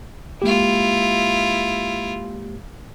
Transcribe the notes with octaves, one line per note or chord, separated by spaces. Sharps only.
G#3 A#3 E4 F4 G4